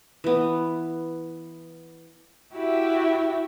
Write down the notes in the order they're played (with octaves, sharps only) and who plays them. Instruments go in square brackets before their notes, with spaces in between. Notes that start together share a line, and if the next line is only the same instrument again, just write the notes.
[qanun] E3 B3
[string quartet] E4 F#4 G4 E5